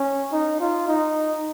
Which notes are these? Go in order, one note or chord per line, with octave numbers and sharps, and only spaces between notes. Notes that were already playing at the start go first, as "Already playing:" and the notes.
Already playing: C#4
D#4
F4
D#4